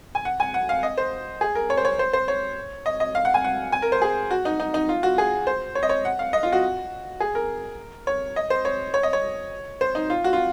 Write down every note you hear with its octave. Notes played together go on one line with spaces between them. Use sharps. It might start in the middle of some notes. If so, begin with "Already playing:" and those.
G#5
F#5
G#5
F#5
F5
D#5
C5
G#4
A#4
C#5
C5
C#5
C5
C5
C#5
D#5
D#5
F5
F#5
G#5
F#5
G#5
A#4
C5
G#4
F#4
D#4
D#4
D#4
F4
F#4
G#4
C5
C#5
D#5
C#5
F#5
F5
D#5
F4
F#4
G#4
A#4
C#5
D#5
C5
C#5
C#5
D#5
C#5
C5
D#4
F4
F#4
F4